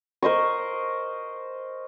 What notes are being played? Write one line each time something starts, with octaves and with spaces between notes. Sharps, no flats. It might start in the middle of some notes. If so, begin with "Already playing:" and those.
A#4 C5 D#5 C#6